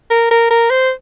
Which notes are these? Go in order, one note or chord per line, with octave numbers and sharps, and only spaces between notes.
A#4
A#4
A#4
C5